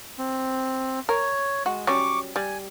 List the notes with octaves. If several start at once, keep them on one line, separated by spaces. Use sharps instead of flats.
C4
A#4 C#5
G#3 F#4
F#3 G3 C#4 C#6 D6
G3 G#5